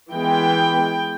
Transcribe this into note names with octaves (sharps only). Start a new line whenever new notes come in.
E3 G#3 B3 G5